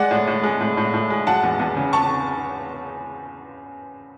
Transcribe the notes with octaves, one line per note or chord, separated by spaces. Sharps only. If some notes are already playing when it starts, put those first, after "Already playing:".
Already playing: G#3 D5 F#5
A2
A2
G#3
A2
A2
A2
G#3
F#3 F#5 A5
E2
E2
C#3
A5 C#6